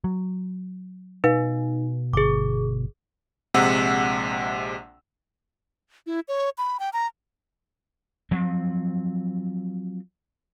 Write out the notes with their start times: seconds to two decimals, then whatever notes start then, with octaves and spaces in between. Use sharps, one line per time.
0.04 F#3
1.24 B2 D#4 B4 F5
2.13 G1 G#4 D6
3.54 A#1 C3 G#3 F#5 E6
6.07 E4
6.28 C#5
6.58 B5
6.80 G5
6.93 A#5
8.31 F3 F#3 C4